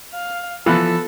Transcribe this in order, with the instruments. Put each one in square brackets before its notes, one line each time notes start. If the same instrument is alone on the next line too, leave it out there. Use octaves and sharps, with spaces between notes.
[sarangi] F5
[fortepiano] E3 B3 [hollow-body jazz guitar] F3 [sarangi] A4